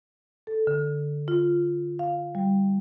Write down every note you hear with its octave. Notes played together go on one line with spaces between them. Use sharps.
A4
D3
F4
F5
G3